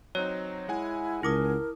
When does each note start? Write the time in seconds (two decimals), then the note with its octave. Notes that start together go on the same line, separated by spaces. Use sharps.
0.15 F#3 C4 D#4 C#5
0.68 G#3 E4 F#5 G#5
1.23 C#2 E4 A#4 D6 D#6